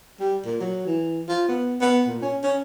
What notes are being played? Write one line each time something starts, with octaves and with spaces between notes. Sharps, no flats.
G3
A#2
F#3
E3
F4
B3
B3
A#2
C#4
C#4